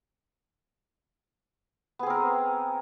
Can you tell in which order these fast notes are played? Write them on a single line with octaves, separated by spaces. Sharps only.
B3 G#4 C4 A#4